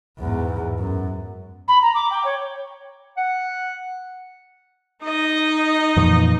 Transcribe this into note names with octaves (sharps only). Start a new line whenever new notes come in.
E2 G#2
F#2
B5
A#5
D6
G5
C#5
F#5
D#4 D#5
F2 A#2 E3